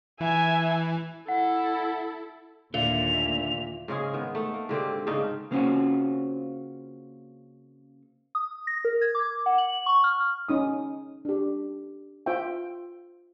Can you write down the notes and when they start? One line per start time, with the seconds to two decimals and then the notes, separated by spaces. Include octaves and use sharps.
0.20 E3 E5 G#5
1.28 E4 A4 F#5
2.74 D#2 A#2 D3 A#3 E5 F7
3.88 G#2 C#3 G#3 G#4
4.13 D#3 B3
4.35 A3 D#4
4.54 A#3
4.69 G#2 D3 C4 G4
5.07 G#2 C#3 D4 D#4
5.51 C#3 A#3 C4 C#4 F4 F#4
8.35 D#6
8.67 A#6
8.85 A#4
9.01 G#6
9.15 D6
9.46 F#5
9.58 F#7
9.86 C#6
10.04 F6
10.49 C#4 D#4 D#6
11.25 D4 G4
12.26 F4 C5 E5 G5